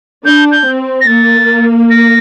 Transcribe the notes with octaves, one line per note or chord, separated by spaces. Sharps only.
D4 G6
G6
C4
A#6
A#3 A6
A#6